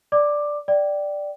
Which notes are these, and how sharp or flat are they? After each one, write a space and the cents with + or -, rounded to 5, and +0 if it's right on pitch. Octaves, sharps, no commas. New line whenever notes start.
D5 +0 D6 +10
D5 +0 G5 -15